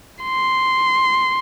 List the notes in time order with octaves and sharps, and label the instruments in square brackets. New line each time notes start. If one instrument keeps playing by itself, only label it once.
[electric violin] C6